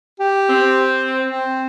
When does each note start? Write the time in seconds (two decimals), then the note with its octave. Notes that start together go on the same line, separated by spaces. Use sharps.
0.20 G4
0.50 C4
1.28 C4